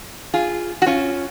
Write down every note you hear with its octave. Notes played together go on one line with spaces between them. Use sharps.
F4 G#4
F#4
C#4 F4